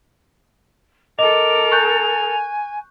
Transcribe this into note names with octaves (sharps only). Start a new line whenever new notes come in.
A4 A#4 D#5 D6 F7
G#5 C#6 F#6 G6